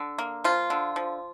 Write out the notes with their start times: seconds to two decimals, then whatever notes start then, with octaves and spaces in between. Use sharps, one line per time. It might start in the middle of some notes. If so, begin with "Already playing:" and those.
Already playing: D3
0.18 A#3
0.44 F3 F4
0.70 D3
0.96 F3